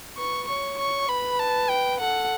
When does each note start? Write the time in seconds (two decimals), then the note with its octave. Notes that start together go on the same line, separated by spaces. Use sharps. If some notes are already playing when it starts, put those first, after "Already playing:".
0.18 B4 C#6
0.48 C#5 C#6
0.79 C#6
1.09 B4 B5
1.39 A5
1.70 G5
2.01 A4 F#5